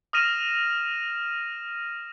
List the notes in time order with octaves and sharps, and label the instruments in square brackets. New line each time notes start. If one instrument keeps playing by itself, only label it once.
[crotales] D#6 F6 A#6 D#7 E7